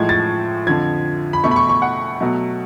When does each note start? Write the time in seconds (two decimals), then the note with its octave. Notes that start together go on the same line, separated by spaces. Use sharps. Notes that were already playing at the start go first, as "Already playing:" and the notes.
Already playing: A2 F3 G#3 G#6
0.09 A6
0.67 F2 D3 F3 G#6
1.33 B5
1.44 B2 A3 C#6
1.51 B5
1.56 C#6
1.69 C#6
1.82 F#5
2.20 B2 F#3 A3